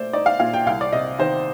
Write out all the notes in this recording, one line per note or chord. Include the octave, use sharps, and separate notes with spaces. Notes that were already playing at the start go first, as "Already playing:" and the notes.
Already playing: A#2 A3 C5 D5
D#4 D5
F5
A#2 F5
G5
C2 F5
D5
C3 D#5
D#3 C5